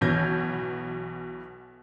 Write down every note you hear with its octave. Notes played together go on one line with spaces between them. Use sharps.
B1 B2 E3 G6 G#6 A#6